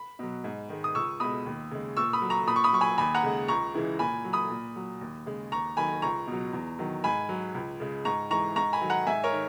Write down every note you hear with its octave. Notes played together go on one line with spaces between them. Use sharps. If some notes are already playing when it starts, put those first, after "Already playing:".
Already playing: B5
B2 F#3
G#2
D#3 G#3
D#6
C#2 C#6 E6
B2 G#3 B5 D#6
D#2
C#3 G#3
A#2 C#6 E6
B5 D#6
F#3
A#5 C#6
A#2 B5 D#6
C#6
B5 D#6
F#3 C#6
G#5 B5
D#2 G#5 B5
F#5 A#5
C#3 G#3
C#2 A#5 C#6
C#3 E3 G#3
A#2 G#5 B5
F#3
B5 D#6
A#2
F#3
D#2
C#3 G#3
D#2 A#5 C#6
D#3 F#3 G#5 B5
C#2 A#5 C#6
B2 F#3
E2
D#3 F#3
G#2 G#5 B5
F#3
C#2
C#3 G#3
G#2 A#5 C#6
E3 G#3 A#5 C#6
G#2 A#5 C#6
G#5 B5
D#3 F#3
F#5 A#5
G#2 E5 G#5
A#4 C#5
D#3